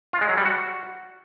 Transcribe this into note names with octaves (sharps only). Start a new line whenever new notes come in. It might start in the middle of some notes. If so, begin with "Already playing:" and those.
F4
G#3
F#3
G3
F#4